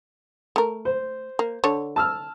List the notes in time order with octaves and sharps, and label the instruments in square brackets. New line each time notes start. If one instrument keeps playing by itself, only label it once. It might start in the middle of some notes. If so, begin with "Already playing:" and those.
[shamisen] A3 A#4
[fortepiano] C5
[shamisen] A#3
D3 C#5
[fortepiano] A5 E6 F6